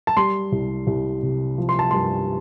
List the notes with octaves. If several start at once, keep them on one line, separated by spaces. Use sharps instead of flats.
A5
G3 C6
C2
C2
C3
F3
C6
A5
G2 C6